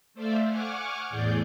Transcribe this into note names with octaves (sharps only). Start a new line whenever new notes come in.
A3 C5 D5 E5 F5
F#5 G#5 C#6 D6 F6
E2 A2 G#4 D5 G6